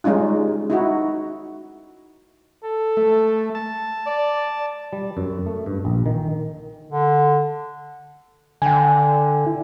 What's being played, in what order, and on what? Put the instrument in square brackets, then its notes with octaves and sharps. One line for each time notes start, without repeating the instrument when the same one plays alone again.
[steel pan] G3 G#3 C#4 D#4 F4
D#4 E4 F#4
[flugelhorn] A4
[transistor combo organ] A3
A5
[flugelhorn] D5
[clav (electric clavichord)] G3
F#2
A3
G2
A#1
D#3
[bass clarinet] D3
[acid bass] D3 [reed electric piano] G5 G#5
[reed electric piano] E4